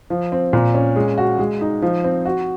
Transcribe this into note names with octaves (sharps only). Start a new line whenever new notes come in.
F3
C4
A#2
C#4
G#3
F#4
G#3
D#4
F3
C4
F#4